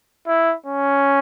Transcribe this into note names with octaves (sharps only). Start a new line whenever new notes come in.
E4
C#4